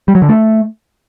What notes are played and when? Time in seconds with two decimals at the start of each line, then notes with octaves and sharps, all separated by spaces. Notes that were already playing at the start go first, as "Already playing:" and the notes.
0.08 G3
0.15 F#3
0.22 D3
0.29 A3